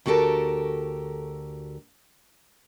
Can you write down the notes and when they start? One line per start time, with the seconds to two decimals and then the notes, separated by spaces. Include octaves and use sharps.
0.06 D2 F#4 G4 A4 A#4 A5